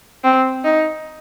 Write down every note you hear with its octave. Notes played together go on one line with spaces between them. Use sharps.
C4
D#4